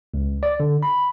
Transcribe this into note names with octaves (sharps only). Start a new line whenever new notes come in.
C#2
D5
D3
B5